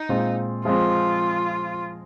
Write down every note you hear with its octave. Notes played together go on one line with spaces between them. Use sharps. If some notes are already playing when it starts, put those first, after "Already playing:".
Already playing: D#4
A#2 G#3 C4 F4
F3 G#3 C4 F4